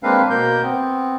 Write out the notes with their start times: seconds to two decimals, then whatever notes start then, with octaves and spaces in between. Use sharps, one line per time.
0.03 G#3 A#3 C4 D4 B4 F5
0.30 B2 A#3 A#4 G6
0.62 B3 C4